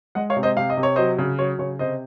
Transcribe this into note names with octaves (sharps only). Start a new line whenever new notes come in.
G#3 D#5 F#5
C#5 F5
C3
C5 D#5
C3 F5
D#5
C3
C#5
F#3 C5 D#5
C#3
F#3 C#5
C#3 C#5
C3 C5 D#5